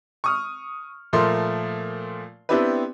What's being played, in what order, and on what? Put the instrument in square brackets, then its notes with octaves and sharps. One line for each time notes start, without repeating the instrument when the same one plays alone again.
[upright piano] C#6 D#6 F6
A#2 F3 A3 A#4 C6
B3 C4 D4 E4 G4 B4